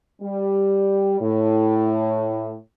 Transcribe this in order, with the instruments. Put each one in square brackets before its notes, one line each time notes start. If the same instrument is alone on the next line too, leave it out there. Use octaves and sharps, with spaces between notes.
[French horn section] G3
A2